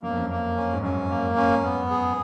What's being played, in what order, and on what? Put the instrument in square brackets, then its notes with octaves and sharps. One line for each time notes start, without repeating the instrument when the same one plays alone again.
[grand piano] F#2 [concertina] A#3
[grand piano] F2
F#2
[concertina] A#3
C#4
[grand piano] G#2
[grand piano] F#2 [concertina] C#4
[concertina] A#3
C#4
B3
G#4